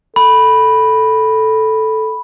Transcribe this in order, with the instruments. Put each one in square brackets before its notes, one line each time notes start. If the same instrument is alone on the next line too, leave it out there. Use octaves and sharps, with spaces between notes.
[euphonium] A4 [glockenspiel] B5